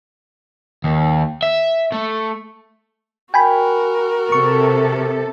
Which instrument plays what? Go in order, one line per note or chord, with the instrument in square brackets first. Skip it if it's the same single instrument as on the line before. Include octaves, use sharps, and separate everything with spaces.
[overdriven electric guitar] D#2
E5
A3
[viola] F#4 A#4 [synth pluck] G5 G#5 B5
[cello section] C3 A4 [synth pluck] C#6